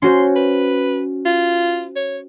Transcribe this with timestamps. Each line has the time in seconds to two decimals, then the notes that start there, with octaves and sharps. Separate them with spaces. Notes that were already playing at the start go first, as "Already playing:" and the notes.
0.02 C#4 F#4 C5 C6
0.36 B4
1.26 F4
1.96 C#5